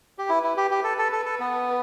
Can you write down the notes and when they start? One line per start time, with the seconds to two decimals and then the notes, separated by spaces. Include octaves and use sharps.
0.18 G4
0.29 E4 B4
0.44 E4
0.57 G4
0.71 G4
0.84 A4 B4
0.98 A4
1.12 A4
1.26 A4
1.40 B3